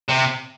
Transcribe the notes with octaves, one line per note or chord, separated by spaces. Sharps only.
C3